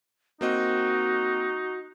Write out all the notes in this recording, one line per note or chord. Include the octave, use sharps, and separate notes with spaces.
A#3 C4 D#4 F#4 D#5